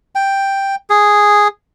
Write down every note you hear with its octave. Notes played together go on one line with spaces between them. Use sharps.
G5
G#4